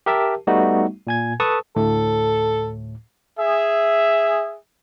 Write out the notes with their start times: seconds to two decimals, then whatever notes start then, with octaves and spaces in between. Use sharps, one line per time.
0.06 G4 A#4 E5 A5
0.47 G3 A3 B3 D#4 F#4
1.07 A#2 G#5 G#6
1.40 A4 B4 A5 C#6 D#6
1.76 D2 A2 A4
3.38 G#4 E5